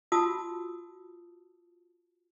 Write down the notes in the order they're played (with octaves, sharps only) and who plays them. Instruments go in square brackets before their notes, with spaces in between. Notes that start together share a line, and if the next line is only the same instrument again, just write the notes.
[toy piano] F4 F#4 A5 D#6 E6